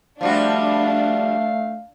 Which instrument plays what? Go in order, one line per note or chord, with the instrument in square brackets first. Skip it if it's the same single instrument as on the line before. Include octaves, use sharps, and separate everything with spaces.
[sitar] F3 G3 F#4 [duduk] A3 [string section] D4 [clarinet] F5